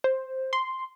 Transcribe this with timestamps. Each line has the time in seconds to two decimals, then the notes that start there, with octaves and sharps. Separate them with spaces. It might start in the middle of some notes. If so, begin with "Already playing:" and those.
0.04 C5
0.53 C6